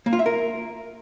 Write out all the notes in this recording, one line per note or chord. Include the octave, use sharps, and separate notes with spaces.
A#3
F4
E5
A#4